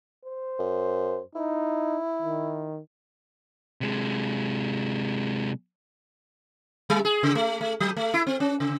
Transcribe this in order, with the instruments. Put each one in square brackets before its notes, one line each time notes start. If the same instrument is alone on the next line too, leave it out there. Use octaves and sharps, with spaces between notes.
[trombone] C5
[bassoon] F#2
[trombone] D#4 [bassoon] E4
[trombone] D#3
[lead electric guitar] C3 G#3
[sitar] G3
G#4
C#3
A3
A3
F#3
A3
E4
C4
C#4
C#3